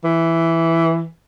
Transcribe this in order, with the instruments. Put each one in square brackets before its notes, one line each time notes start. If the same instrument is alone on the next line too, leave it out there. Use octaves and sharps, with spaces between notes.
[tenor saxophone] E3